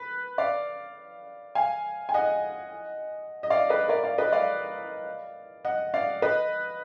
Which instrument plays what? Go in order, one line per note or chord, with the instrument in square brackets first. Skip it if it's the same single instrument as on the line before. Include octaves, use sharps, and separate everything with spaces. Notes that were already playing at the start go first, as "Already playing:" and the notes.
Already playing: [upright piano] B4
D5 F5
F5 G#5
G#5
D#5 F#5
D#5
D5 F5
B4 D#5
A#4 D5
D5 F5
B4 D#5
D5 F5
D#5 F#5
D5 F5
B4 D#5